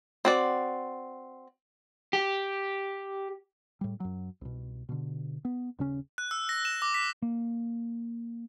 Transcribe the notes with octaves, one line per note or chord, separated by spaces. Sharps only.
C4 F#4 D5
G4
A2 G3
F#2 F#3
C2 B2
B2 D3
B3
D#1 C#3 C#4
F#6
E6
A#6
E7
D6
B6
A#3